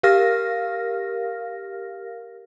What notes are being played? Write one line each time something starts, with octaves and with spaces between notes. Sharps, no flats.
G4 A#4 F5 F6 A#6